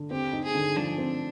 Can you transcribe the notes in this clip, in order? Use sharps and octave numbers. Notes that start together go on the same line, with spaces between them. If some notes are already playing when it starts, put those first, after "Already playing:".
Already playing: D3
C4 G4
D#4
G#4
D3
F3 D4
C4